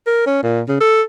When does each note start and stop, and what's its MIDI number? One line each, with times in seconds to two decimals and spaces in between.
0.07 0.26 70
0.26 0.39 61
0.43 0.62 46
0.68 0.77 49
0.81 1.02 69